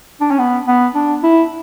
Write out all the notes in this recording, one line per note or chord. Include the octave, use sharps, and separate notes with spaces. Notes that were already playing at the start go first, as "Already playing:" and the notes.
D4
C#4
B3
B3
D4
E4